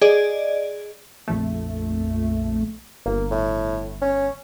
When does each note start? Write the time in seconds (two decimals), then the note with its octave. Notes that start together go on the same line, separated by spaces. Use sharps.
0.02 G#4 D5 D#5
1.28 A#1 F2 A3
3.06 G1 A#3
3.31 A2
4.02 C#4